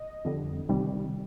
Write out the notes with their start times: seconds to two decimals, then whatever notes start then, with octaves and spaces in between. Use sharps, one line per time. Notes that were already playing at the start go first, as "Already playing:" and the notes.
Already playing: D#5
0.25 F2 D3 G3
0.69 C2 C3 D#3 G3